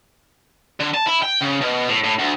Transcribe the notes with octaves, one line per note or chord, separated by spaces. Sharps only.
D3
A5
E4
G5
C#3
B2
A2
A2
D2